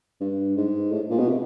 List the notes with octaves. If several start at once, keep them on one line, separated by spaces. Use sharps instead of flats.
G2
G#2
A2
A#2
B2
C3